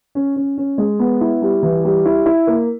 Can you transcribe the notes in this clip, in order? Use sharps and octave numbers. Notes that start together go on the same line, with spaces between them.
C#4
C#4
C#4
G#3
B3
E4
G3
E3
G3
E4
E4
A#3